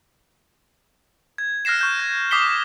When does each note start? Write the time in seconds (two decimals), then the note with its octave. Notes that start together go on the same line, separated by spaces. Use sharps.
1.38 G#6
1.65 F6 F#6 A#6 C7 E7
1.79 C#6 G6 E7
1.99 G#6
2.31 D6 D#6 B6 C7 G7